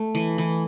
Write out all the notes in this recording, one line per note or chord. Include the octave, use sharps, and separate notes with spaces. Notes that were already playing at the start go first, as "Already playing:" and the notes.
Already playing: A3
E3
E3